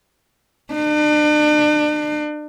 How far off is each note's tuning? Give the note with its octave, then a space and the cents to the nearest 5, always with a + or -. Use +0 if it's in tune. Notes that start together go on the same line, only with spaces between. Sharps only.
D4 +40